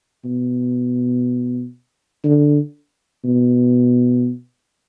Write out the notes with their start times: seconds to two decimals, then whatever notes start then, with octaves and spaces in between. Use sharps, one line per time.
0.25 B2
2.24 D3
3.24 B2